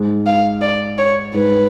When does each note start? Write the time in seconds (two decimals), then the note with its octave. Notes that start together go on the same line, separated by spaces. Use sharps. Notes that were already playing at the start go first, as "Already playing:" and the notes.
Already playing: G#2 G#3
0.27 F5
0.61 D5
0.98 C#5
1.34 G#2 G#3 B4